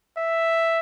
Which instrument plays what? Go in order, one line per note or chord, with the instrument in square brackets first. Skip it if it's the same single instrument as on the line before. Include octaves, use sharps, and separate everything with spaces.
[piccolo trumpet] E5